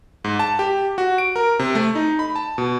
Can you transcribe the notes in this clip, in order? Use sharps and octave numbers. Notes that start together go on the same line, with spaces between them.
G#2
A5
G4
F#4
D7
A#4
C3
A3
D#4
B5
A5
B2